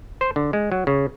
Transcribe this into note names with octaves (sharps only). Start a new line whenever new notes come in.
C5
D3
G#3
F#3
C#3